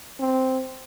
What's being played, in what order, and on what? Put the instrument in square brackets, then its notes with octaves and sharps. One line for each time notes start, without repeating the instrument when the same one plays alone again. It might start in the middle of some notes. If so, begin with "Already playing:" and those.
[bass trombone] C4